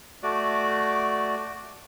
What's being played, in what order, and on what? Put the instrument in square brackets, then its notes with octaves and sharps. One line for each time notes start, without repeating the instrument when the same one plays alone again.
[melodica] A3 F#4 D5